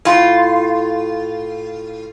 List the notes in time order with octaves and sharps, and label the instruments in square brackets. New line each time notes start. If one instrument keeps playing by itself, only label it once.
[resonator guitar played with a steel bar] A2 F4